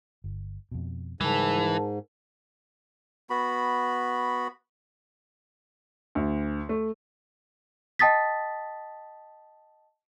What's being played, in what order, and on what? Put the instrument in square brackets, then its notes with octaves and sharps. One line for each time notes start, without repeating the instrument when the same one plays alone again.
[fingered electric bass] G1
F2 B2
[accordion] G#2 [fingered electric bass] C#3 F#3 G3 [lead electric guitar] E3 [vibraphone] A#4 A5
[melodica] B3 F#4 B5
[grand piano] D2
A3
[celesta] D#5 G5 A5 D#6 A6 B6